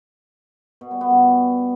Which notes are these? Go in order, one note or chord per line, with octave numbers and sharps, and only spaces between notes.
B2
G3
B3
G2